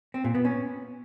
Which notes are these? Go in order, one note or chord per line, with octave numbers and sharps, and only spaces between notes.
C4
A#2
B3
C#4